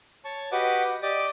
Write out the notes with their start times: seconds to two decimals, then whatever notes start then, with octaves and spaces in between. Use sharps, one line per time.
0.25 C#5 A5 C#6
0.52 F#4 G4 B4 D#5 F#5 D6
1.02 G4 D5 D#5 D6